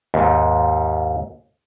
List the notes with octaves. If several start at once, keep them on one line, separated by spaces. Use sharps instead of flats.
D#2 G#2